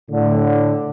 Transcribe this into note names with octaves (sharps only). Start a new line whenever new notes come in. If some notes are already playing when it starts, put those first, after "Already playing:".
A2 D3